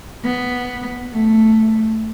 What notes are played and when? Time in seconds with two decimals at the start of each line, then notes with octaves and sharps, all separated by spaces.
0.24 B3
1.13 A3